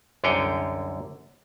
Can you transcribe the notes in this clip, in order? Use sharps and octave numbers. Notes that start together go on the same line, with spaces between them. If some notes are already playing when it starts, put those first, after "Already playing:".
C2 F#2 D3 G#4 C#5 G5